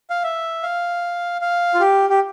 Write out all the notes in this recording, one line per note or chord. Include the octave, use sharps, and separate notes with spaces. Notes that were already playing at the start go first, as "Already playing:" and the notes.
F5
E5
F5
F5
F4
G4
G4